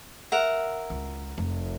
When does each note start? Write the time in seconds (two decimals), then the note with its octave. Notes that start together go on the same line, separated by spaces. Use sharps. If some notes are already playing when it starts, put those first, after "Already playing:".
0.32 A#4 E5 F#5
0.90 C#2
1.38 F1